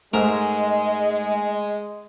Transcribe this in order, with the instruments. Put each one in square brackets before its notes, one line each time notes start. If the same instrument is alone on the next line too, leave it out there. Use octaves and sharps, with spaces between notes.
[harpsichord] G#2 A#4 [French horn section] G#3 [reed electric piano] A3 [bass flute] D#5